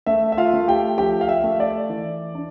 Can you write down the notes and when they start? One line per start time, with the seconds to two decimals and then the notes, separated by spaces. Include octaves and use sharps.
0.06 A3 E5
0.32 E5
0.37 F4 F5
0.53 A3
0.68 G4 G5
0.98 F3 G4 G5
1.21 F5
1.29 E5
1.44 A3
1.60 D5
1.89 E3
2.35 D4